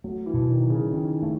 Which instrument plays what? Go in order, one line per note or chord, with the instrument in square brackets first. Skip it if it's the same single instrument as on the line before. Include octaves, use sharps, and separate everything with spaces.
[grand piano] F#3 [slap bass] A3
[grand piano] E3
[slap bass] B2
[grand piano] D#3
[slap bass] F#3
[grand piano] C#3
[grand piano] D#3 [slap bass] C#4
[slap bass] A3